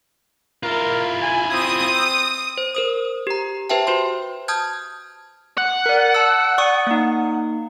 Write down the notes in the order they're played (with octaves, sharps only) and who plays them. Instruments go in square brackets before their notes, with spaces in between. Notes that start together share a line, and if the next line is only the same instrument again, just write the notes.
[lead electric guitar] E4 F4 [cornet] A#4
[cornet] G#5
[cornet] C4 [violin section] D#6
[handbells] C5
A#4 C5 D#6
G4 A#5
G4 B4 C5 E5 G5 A5
F#4 C5 C6
A5 D#6 F6 G6 G#6
[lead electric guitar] F#5
[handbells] A#4 D5
A5 E6
D5 C#6 D#6
A#3 D#4